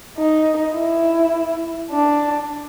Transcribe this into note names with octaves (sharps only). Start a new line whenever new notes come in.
D#4
E4
D4